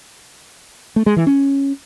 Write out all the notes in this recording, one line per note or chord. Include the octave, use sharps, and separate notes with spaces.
A3
G#3
E3
C#4